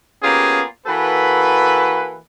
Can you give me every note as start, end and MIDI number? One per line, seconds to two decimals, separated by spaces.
0.22 0.62 58
0.22 0.62 59
0.22 0.62 61
0.22 0.62 65
0.22 0.62 67
0.22 0.62 68
0.86 2.17 52
0.86 2.17 58
0.86 2.17 66
0.86 2.17 69
0.86 2.17 71